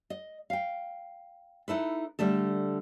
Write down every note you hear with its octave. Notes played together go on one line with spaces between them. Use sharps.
D#5
F5 G5
D#4 E4 A4 B4
D3 G3 A3 A4